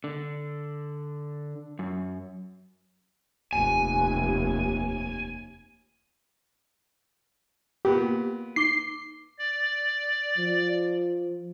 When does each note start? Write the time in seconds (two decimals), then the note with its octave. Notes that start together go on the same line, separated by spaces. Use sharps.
0.04 D3
1.79 F#2
3.53 F1 D#2 G#5
7.85 A#2 B3 G4
8.56 D#4 D6 C7 G7
9.38 D5
10.38 F3